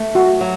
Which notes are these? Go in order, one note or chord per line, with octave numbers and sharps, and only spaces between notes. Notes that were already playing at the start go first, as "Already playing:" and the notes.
Already playing: A3
F#4
F#3